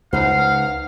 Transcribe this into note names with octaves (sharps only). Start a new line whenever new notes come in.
C#2 D#4 C5 F5 F#5